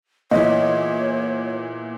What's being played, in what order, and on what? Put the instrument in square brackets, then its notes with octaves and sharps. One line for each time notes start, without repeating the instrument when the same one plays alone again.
[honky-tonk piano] A#2 E3 [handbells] B3 G#4 E5 [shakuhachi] C#5 [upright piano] D#5